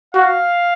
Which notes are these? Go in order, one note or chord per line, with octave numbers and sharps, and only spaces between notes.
F#4 F5